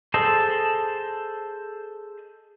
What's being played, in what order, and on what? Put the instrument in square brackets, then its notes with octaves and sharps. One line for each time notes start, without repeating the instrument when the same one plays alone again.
[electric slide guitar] G#4 A4 C5 D#5 A5